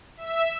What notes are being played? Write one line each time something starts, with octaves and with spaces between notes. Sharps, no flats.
E5